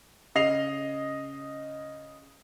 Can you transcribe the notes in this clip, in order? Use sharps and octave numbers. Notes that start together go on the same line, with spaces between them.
C#3 D#5 C7 F7